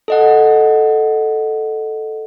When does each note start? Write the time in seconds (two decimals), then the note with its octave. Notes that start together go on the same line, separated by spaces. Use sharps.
0.08 A4 D#5 F#5